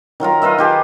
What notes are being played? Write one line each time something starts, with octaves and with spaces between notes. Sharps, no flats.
D#3 F#3 F4 A#4
F4 B4 D#5 E5
D#3 G4 G#4